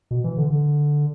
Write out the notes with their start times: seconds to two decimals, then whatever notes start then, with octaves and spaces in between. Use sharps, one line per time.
0.11 B2
0.24 E3
0.37 D3
0.50 D3